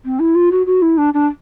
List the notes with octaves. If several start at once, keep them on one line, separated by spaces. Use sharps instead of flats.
C4
E4
F4
F#4
F#4
E4
D4
D4